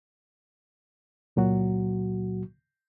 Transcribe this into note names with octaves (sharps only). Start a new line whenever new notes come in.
C#2 A#2 F#3 F#4